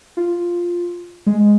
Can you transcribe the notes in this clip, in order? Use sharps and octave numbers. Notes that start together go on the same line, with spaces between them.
F4
G#3